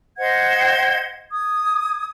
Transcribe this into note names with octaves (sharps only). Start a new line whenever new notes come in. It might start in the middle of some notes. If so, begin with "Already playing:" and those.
C5 D#5 F#5 G#6
D#6 G#6